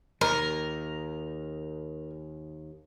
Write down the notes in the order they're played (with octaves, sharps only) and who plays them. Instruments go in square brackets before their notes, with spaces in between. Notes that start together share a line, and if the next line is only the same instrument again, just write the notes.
[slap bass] D#2 [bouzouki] A#4